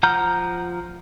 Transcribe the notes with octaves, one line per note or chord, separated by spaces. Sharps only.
F3 F#5 A#5 F6 G6